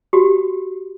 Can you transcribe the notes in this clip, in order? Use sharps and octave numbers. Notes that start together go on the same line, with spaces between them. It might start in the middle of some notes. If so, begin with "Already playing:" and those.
F#4 G4